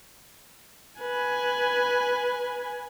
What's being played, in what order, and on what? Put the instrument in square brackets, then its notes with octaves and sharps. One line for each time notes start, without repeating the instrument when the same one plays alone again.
[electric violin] B4 G#5